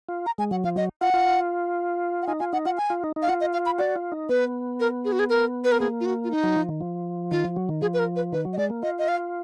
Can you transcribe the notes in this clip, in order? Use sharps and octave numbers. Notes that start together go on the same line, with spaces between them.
F4
A#5
G#3 G#5
F#3 F#5
F3 F5
F#3 D#5
F4 F#5
F4
F#5
D#4 G#5
F4 G#5
D#4 F#5
F4 F#5
G#5
F4
D#4
D#4
F5
F4 F#5
D#5
F5
B5
F#4 D5
F4
D#4
B3 B4
A#4
G#4
F#4
G#4
A#4
B4
A#4
A#3 G#4
F4
F#4
F4
D#4
F#3
F3
D#3
F3
D#3 F4
F3
F#3
D#3
F3 G#4
B4
A#4
B4
D#3 B4
F#3
D#5
G#3 D5
A#3
F4 D#5
D#5
F5